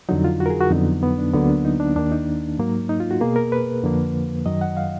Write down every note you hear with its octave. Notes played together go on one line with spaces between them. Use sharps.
F2 D3 F#3 D#4
F4
F#4
A#4
G#4
F#4
F2 D3 F#3 B3 D#4
B3
D4
D2 D3 F#3 A#3 B3
D4
D#4
D4
D#2 D#3 A#3 D4
D#4
G#2 F#3 A#3
D#4
F4
F#4
B2 A#3 G#4
A#4
B4
F2 D3 F3 A#3
F#2 D#3 F#3 D#5
F#5
F5